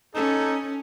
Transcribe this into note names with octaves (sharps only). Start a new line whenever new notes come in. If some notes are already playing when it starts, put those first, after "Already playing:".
C#4 D#4 A4